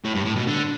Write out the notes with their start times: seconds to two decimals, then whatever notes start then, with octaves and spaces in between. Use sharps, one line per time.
0.05 A2
0.15 G2
0.25 A2
0.36 B2
0.47 D3